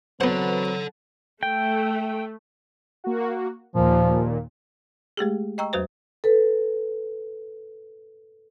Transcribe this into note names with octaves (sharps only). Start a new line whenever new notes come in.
F#3 B3 C4 F#4 A4 B4 C5 F#5
A3 G5
A#3 F#4
D#2 A#2 F3
G#3 A3 G4 G#4
D#5 G5 A#5 C#6 E6
E2 F#3 F#4 B4 C5
A4 B4